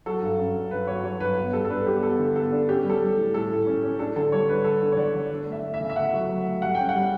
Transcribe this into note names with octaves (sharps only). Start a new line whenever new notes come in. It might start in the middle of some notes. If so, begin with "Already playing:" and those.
F#3 A4
G2
C#4
G2
G2 B4
F#3 C#5
F#3 C#5
G2 B4
B3
G3 A4
A4
D4 B4
B3 G4
B3 A4
D3
B3 A4
D4
C#4 G4
G3
A4
G3
A2
A2 A4
A2
C#4
C#4
D4 A4
D3 A4
G3 C#5
D4 B4
D3 A4
D3
C#5
D3 D5
D3
D4
A3
E5
A3
E5
C#3
E5
A3 F#5
F#3
F#3
A3
G3 F#5
C#4 G5
F#5
G3